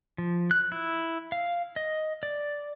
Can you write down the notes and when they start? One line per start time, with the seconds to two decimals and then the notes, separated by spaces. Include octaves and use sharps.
0.18 F3
0.51 F#6
0.72 E4
1.32 F5
1.76 D#5
2.23 D5